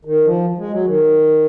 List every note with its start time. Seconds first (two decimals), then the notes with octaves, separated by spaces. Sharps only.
0.05 D#3
0.25 F3
0.58 G#3
0.71 F#3
0.85 D#3